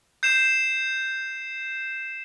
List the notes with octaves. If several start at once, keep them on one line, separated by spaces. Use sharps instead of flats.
G6 C7 E7